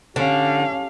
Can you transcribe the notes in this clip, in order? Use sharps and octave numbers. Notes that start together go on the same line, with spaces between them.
D3 C#4 G4 F5